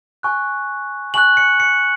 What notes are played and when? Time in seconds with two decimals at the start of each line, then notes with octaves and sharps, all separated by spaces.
0.23 G#5 C#6 F#6
1.14 G#5 C#6 F#6 F#7
1.37 C#7
1.60 C#7